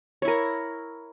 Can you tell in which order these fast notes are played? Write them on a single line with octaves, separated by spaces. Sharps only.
C#5 E4 A#4